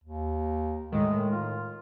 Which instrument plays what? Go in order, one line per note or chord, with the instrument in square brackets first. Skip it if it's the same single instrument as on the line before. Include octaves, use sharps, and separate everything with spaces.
[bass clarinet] D#2
[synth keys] A2 D#3 [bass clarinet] G#3
[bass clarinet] F4